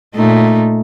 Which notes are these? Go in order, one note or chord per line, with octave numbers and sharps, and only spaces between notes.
A#2 A3 D#4